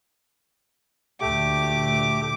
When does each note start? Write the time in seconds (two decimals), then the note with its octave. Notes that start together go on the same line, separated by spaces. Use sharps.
1.21 D2 A#2 A3 G4 D6